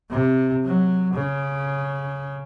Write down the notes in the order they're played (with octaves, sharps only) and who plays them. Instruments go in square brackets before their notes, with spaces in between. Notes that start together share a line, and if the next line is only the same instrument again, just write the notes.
[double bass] C3
F#3
C#3